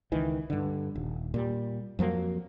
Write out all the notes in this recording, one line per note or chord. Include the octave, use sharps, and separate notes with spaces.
C#2 D#3 E3
G2 D3
D#1
A#2 G3
F2 F3 F#3 A#3